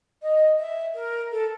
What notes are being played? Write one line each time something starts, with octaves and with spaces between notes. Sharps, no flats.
D#5
E5
A#4
A4